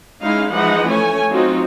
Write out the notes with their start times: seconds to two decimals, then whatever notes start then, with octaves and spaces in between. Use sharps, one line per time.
0.22 G#3 C#4 D#4 E4 F5
0.52 E3 F3 G#3 D#4 D#5 F#5
0.89 A3 C#4 C#5 G#5
1.31 F#3 C4 D#4 F4 F#4